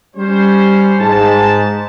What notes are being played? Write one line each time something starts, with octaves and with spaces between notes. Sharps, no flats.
G3 C#4 C5
G#2 A5